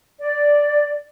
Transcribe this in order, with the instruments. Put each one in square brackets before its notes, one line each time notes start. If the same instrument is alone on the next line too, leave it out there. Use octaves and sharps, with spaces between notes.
[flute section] D5